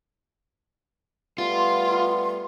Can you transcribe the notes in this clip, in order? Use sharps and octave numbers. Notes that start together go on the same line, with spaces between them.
G3 A3 B3 F4 C6